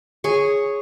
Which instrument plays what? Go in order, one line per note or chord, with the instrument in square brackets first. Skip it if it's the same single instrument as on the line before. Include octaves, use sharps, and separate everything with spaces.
[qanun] G#4 C#5